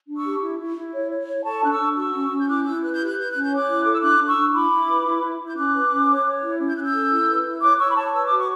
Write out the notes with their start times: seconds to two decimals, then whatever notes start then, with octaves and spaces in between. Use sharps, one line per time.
0.08 D4
0.16 C#6 E6
0.25 G4
0.42 E4
0.60 E4
0.76 E4
0.93 C#5
1.11 C#5
1.27 C#5
1.45 A4 A5 C#6
1.62 D4 F#6
1.71 C#6 E6
1.80 D4
1.96 F#4 C#6 E6
2.13 C#4
2.30 C#4
2.39 G6
2.48 E4 D6 F#6
2.64 E4 E6 G6
2.82 B4 F#6
2.94 G6
2.99 G4
3.06 F#6
3.16 B4 G6
3.30 C#4 F#6
3.43 G6
3.51 C#5 D6 F#6
3.68 E4
3.85 A4 D6
3.94 E6
4.02 D4 D6 F#6
4.20 D4
4.28 C#6 E6
4.37 D4
4.54 E4 B5 D6
4.70 E4
4.87 B4
5.05 E4
5.22 E4
5.39 E4
5.47 G6
5.56 C#4 D6 F#6
5.73 B4
5.90 C#4
6.08 C#5
6.25 C#5
6.42 E4
6.59 C#4
6.68 G6
6.75 C#4 F#6
6.83 E6 G6
6.93 A4
7.10 E4
7.27 B4
7.45 E4
7.62 C#5 D6 F#6
7.79 C#5 C#6 E6
7.90 B5
7.96 C#5 A5 C#6
8.13 B4 E6
8.25 D6
8.31 F#4
8.37 C#6